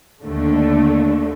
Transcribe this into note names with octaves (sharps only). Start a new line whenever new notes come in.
D#2 D3 A3